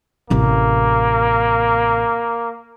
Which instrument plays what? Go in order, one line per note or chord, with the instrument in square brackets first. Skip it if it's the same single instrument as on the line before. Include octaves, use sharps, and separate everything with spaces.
[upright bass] A1 C3 [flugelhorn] A#3